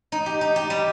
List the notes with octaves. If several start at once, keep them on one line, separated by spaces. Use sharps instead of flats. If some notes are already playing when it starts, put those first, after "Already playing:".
D#4
G4
D#4
G4
G3